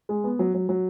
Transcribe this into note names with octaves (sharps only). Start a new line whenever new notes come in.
G#3
B3
F#3
F#3
F#3